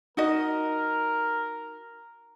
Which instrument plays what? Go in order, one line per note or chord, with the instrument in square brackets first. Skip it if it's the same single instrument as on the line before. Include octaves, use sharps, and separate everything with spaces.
[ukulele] D#4 F#4 D#5 [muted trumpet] A#4